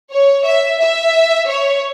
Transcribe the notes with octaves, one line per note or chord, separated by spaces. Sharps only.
C#5
E5
E5
C#5